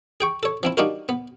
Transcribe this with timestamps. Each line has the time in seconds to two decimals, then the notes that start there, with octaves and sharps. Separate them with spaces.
0.21 G#4 G5 C#6
0.43 A4 C#5
0.63 F3 C4 E4
0.77 G3 D4 D#4 F4 F#4 A#4
1.09 B3